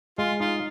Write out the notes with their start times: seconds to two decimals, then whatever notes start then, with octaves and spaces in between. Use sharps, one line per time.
0.18 G#3 F4
0.40 D#4 F4